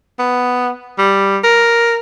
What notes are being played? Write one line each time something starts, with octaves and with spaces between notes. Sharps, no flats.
B3
G3
A#4